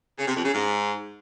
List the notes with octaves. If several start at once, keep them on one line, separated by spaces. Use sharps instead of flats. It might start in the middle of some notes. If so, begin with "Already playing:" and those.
C#3
C3
F2
C#3
G#2